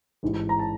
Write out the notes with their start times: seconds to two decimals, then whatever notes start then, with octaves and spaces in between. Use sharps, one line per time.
0.23 A1 G#2 E3
0.49 A#5
0.59 A5